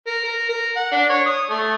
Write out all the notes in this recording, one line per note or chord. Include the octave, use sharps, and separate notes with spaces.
A#4
A#4
A#4
F#5
D4
C#5
D#6
A3